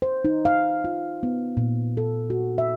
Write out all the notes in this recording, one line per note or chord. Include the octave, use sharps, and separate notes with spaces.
C5
D#4
F5
F4
B3
A#2
A4
F#4
E5